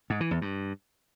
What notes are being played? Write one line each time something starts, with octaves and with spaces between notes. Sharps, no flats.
G#2
E3
E2
G2